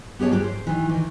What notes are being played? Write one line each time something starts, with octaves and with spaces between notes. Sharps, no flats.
B3 G4 G#4 C#5 A5
G#2 G3 G4 G#4
C5
D#3 E3
D#3 E3